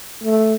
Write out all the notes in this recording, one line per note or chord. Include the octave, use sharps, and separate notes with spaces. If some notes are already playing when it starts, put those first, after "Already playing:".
A3